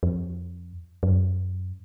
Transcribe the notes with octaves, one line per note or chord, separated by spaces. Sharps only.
F2
F#2